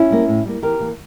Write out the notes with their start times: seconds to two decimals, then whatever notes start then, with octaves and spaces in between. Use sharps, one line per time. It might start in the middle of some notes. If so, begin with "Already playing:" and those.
Already playing: C#4 E4
0.11 G3 A#3
0.28 A2
0.46 G3 A#3
0.62 E2 G4 A#4
0.80 E3 A#3